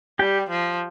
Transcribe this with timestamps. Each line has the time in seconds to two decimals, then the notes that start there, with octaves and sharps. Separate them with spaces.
0.19 G3 G4 G5
0.49 F3